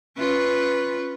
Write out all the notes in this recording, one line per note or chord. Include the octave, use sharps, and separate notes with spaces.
C#4 F4 B4